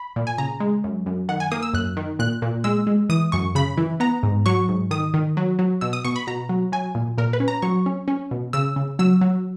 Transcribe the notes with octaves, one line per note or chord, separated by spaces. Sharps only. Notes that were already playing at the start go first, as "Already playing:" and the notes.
Already playing: B5
A#2
G#5
C#3 A#5
G#3
F#2
F#2
D#3 F#5
G#5
A#3 D#6
E6
F#2 F#6
D#3
A#2 F#6
A#2
G#3 E6
G#3
E3 D#6
F#2 C#6
C#3 B5
E3
B3 A#5
G#2
F#3 C#6
G#2
D#3 D#6
D#3
F#3
F#3
B2 E6
D#6
B2 C#6
B5
B2 A#5
F#3
F#3 G#5
A#2
A#2 A#4
B4
C#4
A#5
F#3 C#6
C#4
C#4
B2
C#3 E6
C#3
F#3 E6
F#3